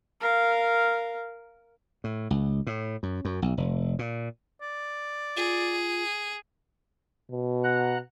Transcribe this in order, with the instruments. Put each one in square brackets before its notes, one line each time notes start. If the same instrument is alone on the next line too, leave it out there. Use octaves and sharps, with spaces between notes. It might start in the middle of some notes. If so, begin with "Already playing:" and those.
[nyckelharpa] A#4 F5
[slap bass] A2
C#2
A2
F#2
F#2
B1
F1
A#2
[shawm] D5
[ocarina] F4 [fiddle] G#4
[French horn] B2
[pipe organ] F#5 A#5 F#6